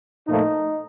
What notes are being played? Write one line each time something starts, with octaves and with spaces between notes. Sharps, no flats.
A#2 F3 A3 D#4